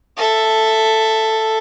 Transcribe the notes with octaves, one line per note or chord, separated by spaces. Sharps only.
A4 E5